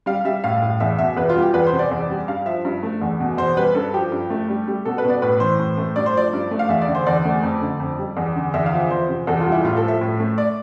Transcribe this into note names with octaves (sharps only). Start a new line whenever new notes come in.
G3 F5
G3 E5
A2 F5
A2
E2 E5
B2 E5
E2 B4
F4
G3
G4
E2 B4
C5
C3
D5
E2
G3
G2 F5
F3 E5
G2
A3
E2
B2
E2 C5
G3 B4
G2 A4
F3 G4
G2
A3
G3
G3
B2 A4
B4
B2
D5
A2 B4
E3 C5
A2
A3
G2 D5
C5
F3 D5
G2
A3
F5
E2 E5
D5
D3
C5
E2 D5
A3
F2
D3
F2
G3
E2
D3
E2 E5
F5
F3
E5
E2 C5
C3
E2 A4
F4
G3
E4
A2 F4
A4
F3
E5
A2
A3
D5